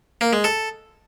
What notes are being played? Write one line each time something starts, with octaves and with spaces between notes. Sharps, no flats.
A#3
G#3
A4